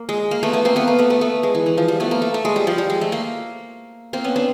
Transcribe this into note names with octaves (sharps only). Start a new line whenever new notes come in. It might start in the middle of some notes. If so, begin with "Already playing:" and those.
Already playing: A#3
G#3
A#3
A3 B3
A3 B3
A#3 C4
A3 B3
A#3
A3 B3
A3 B3
A3 B3
G#3
E3
E3
F3
G3
A3 B3
A#3
A3
A3
G#3
G3
F3
G3
G#3
A3
A#3
A#3 C4
B3 C#4
C4 D4